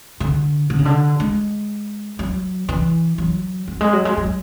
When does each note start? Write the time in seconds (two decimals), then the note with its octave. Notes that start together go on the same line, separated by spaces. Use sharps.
0.20 D3
0.70 D3
0.78 C#3
0.85 D3
1.20 G#3
2.19 F#3
2.69 E3
3.18 F#3
3.68 F#3
3.81 G#3
3.93 F#3
4.05 G#3
4.17 F#3